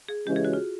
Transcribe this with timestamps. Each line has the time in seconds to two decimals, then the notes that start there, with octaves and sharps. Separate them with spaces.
0.09 G#4
0.27 C#3 E3 G#3 C#4 G4
0.36 G#4
0.45 F#4
0.53 F4